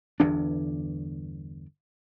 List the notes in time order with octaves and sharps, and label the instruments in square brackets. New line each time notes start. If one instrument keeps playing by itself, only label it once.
[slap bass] G1 E2 G2 D4